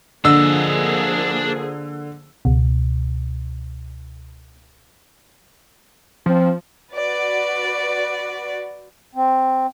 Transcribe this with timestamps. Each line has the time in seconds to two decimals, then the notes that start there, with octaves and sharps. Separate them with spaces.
0.25 D3 F3 A#3 D4 G#4 D#5 E6
2.45 C#2 B2
6.26 F3 C4
6.91 F#4 B4 D5
9.15 C4